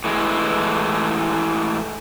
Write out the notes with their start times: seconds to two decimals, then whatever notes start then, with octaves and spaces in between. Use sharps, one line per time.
0.04 A2 E3 G#3